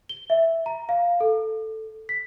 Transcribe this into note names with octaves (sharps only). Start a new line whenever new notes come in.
G7
E5
A#5
F5
A4
B6